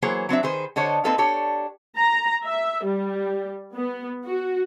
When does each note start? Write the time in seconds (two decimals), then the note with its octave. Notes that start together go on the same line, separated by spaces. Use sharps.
0.02 E3 F#3 A#3 G#4 C5 C#5
0.29 F#3 C4 D4 E5
0.43 D#3 G#4 B4 C5
0.76 D3 A4 C5 C#5 D#5
1.04 A#3 C4 D#4 A4 B4 F5
1.18 D4 G4 A4 C#5
1.96 A#5
2.44 E5
2.86 G3
3.74 B3
4.25 F#4